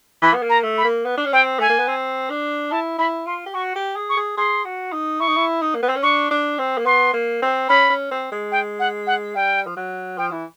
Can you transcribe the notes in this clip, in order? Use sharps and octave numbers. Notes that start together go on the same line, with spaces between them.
E3 B5
B3
A#3
A#5
A3
B5
A#3
B3
D4
C#4
C4 G5
A3 G#5
A#3
B3
C4
D4
E4 A5
E4 B5
F4 C6
G4
F#4 C#6
G4
G#4
C#6
G#4
G#4 C6
F#4
D#4
E4 C#6
D#4
E4
D#4
A#3
B3
C4
C#4
D4 C#6
D4
C4
A#3
B3 C6
A#3
C4
C#4 B5
C#4
C4
G#3
G5
F#5
F#5
G3 G5
F3
F#3
F3 G5
E3